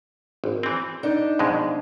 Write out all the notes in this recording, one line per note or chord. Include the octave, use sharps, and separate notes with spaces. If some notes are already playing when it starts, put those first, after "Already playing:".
G#1
E3 C4
D4 D#4
F2 B2 G#3